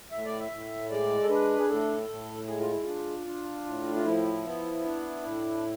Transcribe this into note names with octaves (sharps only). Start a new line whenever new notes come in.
A2 E5
D5
E5
A2
G#3 D5
A4
D4 B4
G#4
A2 A4
A2
G#3 G#4
F4
E4
D4 F4
D4
A2
F4
F3 E4
B3
D4
A2